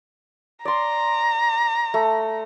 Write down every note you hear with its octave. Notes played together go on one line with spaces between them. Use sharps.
D5 A#5 C6
A3